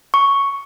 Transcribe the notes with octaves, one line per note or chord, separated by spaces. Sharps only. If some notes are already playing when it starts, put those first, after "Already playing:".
C#6